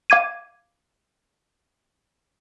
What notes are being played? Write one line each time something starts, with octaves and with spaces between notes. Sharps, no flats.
F5 D6 G#6 D#7